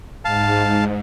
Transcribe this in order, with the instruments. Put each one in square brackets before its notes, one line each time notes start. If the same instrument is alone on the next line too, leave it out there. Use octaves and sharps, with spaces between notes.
[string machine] G#2 [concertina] F5 A5